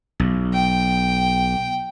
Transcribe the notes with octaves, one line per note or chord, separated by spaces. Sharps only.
B1
G5